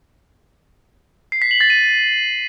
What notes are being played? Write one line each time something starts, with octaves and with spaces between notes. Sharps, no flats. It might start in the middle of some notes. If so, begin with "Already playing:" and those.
C7
B6
F#7
A6
D#7